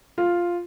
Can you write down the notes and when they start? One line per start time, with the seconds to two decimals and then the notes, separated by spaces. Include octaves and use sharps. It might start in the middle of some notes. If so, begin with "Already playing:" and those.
0.18 F4